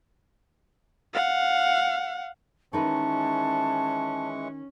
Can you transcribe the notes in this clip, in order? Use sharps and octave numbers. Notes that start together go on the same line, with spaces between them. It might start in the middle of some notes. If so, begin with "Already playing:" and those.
F5 F#5
D#3 E3 G#3 C#4 D#4 B4 A5 C#6